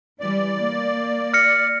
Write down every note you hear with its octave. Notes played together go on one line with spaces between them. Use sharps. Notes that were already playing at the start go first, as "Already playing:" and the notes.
E3 G3 D5
A#3
F6 A#6 C#7